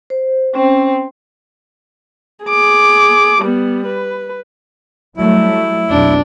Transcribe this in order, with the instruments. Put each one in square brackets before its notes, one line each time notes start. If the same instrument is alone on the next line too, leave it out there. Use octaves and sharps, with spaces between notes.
[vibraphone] C5
[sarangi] C4 [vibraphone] C#4
[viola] G#4 D6
G3 B3
B4
[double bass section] F#3 G3 A3 [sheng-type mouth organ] E4
[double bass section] B1 F2 [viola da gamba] D4